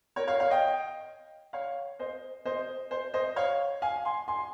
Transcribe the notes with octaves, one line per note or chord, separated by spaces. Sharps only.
A#4 C#5
C#5 F5
C#5 F5
D#5 G5
C#5 F5
C5 D#5
C5 D#5
C5
C5 D#5
C#5 F5
F5 G#5
G#5 C6
G#5 C6